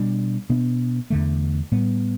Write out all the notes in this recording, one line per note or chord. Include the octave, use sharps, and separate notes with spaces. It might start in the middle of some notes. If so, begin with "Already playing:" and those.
Already playing: B2 G3 D4
B2 B3 D4
E2 D3 A3
A2 G3 B3